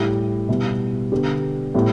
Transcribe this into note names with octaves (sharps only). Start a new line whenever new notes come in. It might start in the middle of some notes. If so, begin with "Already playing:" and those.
Already playing: A2 G3 E4 G4
B2 G3 E4
D3 B3 G4
A2 G3 B3